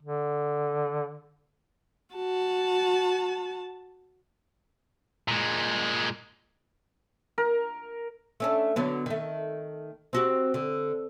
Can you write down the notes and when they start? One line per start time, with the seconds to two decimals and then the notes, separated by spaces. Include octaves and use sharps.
0.02 D3
2.15 F#4 A5
5.28 A#2 G#3
7.38 A#4
8.40 A3 C#4 D4
8.76 D3 F#3 B3
9.06 D#3 A3
10.13 C4 F#4 G4
10.54 D3